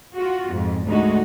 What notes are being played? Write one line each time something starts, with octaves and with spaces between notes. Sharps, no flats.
F4 F#4
F2 G#2
D2 G#3 D#4 F#4